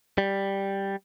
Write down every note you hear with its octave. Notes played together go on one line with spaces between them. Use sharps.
G3